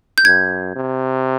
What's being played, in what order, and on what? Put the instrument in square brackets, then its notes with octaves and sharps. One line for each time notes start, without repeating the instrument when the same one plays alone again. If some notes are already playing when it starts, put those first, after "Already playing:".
[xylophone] G6
[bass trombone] F#2 [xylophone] G#6
[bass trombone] C3